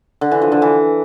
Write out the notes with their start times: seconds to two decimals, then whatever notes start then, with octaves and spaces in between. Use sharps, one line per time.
0.21 D3
0.31 E3
0.42 F3
0.52 D3
0.62 E3